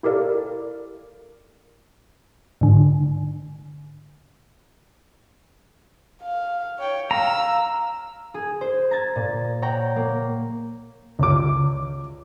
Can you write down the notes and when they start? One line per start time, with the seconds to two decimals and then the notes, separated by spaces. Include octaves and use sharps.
0.03 E4 G4 A4 A#4 D5 F5
2.61 G#2 D3
6.22 F5
6.79 C#5 G5
7.11 F5 A#5 E6
8.34 G#4
8.61 C5
8.91 A#5 G#6 A6
9.16 A#2
9.62 C#5 F#5 G5 A#5
9.96 A#3
11.19 C#2 D6